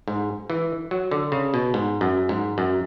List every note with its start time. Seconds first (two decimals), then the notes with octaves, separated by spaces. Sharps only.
0.08 G#2
0.50 E3
0.91 F#3
1.11 D3
1.32 C#3
1.54 B2
1.74 G#2
2.01 F#2
2.29 G#2
2.58 F#2